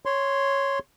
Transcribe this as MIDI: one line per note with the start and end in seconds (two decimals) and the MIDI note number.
0.06 0.79 73
0.06 0.79 84